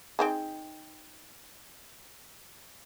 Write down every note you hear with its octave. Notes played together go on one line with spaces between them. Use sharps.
C4 D#4 G#4